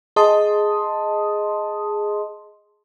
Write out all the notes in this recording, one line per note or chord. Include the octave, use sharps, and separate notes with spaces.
G#4 D#5 A5 C6 D#6